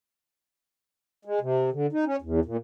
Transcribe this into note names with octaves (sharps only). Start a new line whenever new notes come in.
G#3
C3
D3
D#4
C#4
E2
A#2